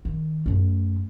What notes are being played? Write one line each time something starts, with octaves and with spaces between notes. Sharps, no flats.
D#3
F#2 A3